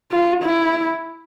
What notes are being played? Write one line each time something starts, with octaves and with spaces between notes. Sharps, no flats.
F4
E4